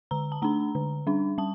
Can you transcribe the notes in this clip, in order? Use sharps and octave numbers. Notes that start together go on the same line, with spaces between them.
D3 A#5
A5
A3 D4 A#5
D3
G3 D4
G3 A5